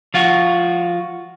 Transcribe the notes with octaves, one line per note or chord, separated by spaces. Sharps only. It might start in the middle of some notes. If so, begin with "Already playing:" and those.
F3 F4 F#4